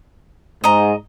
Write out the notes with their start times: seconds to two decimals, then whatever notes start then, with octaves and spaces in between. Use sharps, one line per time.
0.64 G#2 D#5 A#5